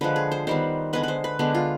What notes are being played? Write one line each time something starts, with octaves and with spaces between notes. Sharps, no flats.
D3 F3 G#3 B4
G#4
C5
D#3 G3 B3 C5
D3 G#3 B3 B4
B4 C5
B4
D3 G#3 B3 D4
F4